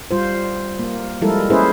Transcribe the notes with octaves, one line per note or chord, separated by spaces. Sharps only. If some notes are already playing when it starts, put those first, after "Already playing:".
G3 F4 C5
A#3
F3 G3 G#3 E4 A4 A#4
A#3 C#4 E4 G#4 B4 C5